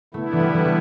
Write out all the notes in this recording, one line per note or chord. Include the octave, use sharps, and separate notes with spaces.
D3 A3 B3 E4
E3
G3
G3
A3